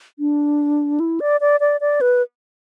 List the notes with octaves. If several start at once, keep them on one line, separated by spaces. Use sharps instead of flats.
D4
E4
D5
D5
D5
D5
B4